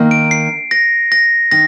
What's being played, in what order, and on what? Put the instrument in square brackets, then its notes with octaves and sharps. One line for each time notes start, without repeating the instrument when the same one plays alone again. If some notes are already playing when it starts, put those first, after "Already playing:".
Already playing: [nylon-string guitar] D#3 A#3 D#4
[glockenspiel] D7
C7
A#6
A#6
[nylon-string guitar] D#3 [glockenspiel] A#6